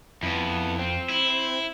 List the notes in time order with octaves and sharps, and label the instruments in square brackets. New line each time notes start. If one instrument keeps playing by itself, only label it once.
[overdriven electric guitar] F2 [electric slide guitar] B3 E4
[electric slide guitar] C4
[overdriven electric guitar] E4